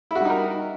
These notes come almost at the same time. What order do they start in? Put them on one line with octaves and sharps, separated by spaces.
E4 F#4 G3 D#4 A#4